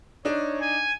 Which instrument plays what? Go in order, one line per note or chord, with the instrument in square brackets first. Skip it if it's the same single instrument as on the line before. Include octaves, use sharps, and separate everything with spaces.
[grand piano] D4 D#4 [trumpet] C#5
[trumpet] G#5